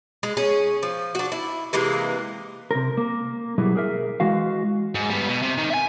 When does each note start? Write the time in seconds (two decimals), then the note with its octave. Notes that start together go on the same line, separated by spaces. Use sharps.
0.23 G#3
0.37 C#4 G#4
0.83 F3
1.15 D4 F#4
1.32 E4
1.73 C3 E3 G#3 A#3
2.71 C3 A#4
2.97 A#3
3.58 B2 F#3 G3 E4 G#4
3.75 G#4 A#4 E5
4.20 E3 G#3 F#4 F5
4.95 G#2
5.10 G3 B3
5.28 B2
5.42 C3
5.58 D#3
5.70 E5 G#5